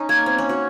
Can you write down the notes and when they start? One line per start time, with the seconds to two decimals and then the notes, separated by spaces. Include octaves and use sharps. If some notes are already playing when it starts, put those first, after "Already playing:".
Already playing: C#4 D#4
0.09 A#3 G#6
0.26 C4
0.38 C#4
0.49 F#4